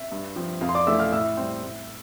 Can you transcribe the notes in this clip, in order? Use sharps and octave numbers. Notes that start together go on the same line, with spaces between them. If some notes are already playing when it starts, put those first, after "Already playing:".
Already playing: E5
G2
F3 C4
F2 F5
C6
D5 D6
E3 A3 E5 E6
F5 F6
A2 E5 E6
G3 C4
A2